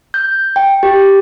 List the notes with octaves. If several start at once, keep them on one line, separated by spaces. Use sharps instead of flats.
G6
G5
G4